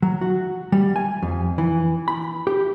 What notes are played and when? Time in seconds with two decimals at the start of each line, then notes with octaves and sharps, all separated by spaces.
0.03 F#3
0.21 F#4
0.72 G3
0.96 G#5
1.23 F2
1.58 E3
2.08 B5
2.47 G4